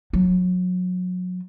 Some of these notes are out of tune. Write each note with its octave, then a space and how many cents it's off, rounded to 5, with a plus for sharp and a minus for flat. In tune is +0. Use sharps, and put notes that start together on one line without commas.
F#3 -30